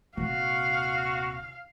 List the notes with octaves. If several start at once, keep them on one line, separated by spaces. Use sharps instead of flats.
D#1 C3 F#4 F5